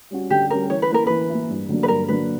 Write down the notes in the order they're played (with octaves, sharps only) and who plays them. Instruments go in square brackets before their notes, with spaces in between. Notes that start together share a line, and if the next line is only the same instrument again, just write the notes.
[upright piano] G3 C#4 F#4
[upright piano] D3 [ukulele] G4
[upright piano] G3 C#4 F#4 [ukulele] A#4
[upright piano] E3 [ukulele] C#5
[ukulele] B4
[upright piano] A#3 E4 [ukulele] A#4
[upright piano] E3 [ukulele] B4
[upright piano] A#3 E4
G2
D3 F#3 A#3 D4
[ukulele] B4
[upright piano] G2 [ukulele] A#4
[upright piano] D3 F#3 A#3 D4 [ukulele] B4